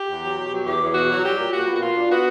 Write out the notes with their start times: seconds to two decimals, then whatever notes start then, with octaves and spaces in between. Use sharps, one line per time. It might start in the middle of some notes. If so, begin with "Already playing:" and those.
Already playing: G4
0.09 E2
0.22 F#3
0.37 B2
0.52 F#3
0.65 E2 G4
0.81 E2
0.94 B2 F#4
1.09 F#3
1.24 G3 G4
1.38 A#2
1.52 A#2 F#4
1.66 B3
1.75 F#4
1.81 A#2 F4
1.95 D4
2.10 B3 F#4